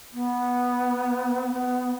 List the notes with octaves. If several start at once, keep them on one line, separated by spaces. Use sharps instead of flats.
B3
B3